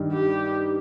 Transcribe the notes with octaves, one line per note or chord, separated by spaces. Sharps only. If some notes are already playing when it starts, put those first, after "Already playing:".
Already playing: G2 D#3 G3 D#4
G4